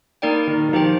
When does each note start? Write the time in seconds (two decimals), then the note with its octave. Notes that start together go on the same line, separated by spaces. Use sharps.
0.22 A#3 D#4 A#4 D5 G5
0.47 D#3
0.69 D#3
0.73 F3 D#4 G4 C5 G5